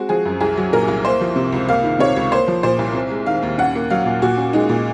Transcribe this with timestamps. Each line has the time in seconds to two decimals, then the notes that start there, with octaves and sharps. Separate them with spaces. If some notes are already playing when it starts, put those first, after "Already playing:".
Already playing: G#3 C4 F#4
0.09 F3 G#4
0.25 F#2
0.40 C2 G#4
0.57 F#3
0.73 A#2 A#4
0.88 C2
1.04 A#3 C5
1.21 F3
1.36 C3
1.52 C#2
1.69 A#3 F5
1.84 D#3
1.99 C3 C#5
2.16 C#2
2.32 A#3 C5
2.48 F3
2.63 A#2 C5
2.79 C2
2.94 C4
3.11 G#3
3.26 D#3 F5
3.43 D#2
3.58 C#4 F#5
3.75 A#3
3.90 F#3 F5
4.06 A#2
4.22 A#2 F#4
4.37 C#4
4.53 G#3 D#4
4.69 A#2